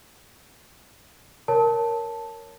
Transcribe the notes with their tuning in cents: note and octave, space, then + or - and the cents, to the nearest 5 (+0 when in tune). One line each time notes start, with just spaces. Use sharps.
A#4 +0 C#5 +0 A5 +0